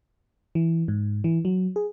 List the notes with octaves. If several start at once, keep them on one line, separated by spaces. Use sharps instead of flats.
E3
G#2
E3
F#3
G#4